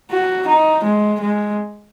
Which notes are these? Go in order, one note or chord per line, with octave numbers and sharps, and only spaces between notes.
F#4
D#4
G#3
G#3